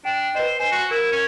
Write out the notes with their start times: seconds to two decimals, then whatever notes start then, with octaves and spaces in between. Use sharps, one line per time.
0.05 D4 G5
0.35 B4 C5 D#5
0.60 C5 G#5
0.72 F#4
0.91 E4 A#4
1.12 C#4